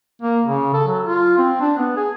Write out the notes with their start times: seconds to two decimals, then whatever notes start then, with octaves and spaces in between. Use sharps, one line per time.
0.22 A#3
0.45 C#3
0.74 A4
0.87 F#3
1.06 F4
1.38 C4
1.61 D4
1.78 B3
1.97 G#4